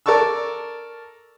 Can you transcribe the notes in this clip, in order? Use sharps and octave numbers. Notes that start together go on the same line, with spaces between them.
A4 A#4 D5 A5 C#6 E6